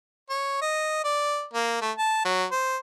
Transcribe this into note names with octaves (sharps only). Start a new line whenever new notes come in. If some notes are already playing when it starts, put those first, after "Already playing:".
C#5
D#5
D5
A#3
A3
A5
F#3
C5